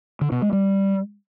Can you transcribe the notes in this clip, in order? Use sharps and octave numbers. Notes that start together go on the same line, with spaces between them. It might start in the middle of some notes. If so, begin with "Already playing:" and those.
D3
B2
G#3
G3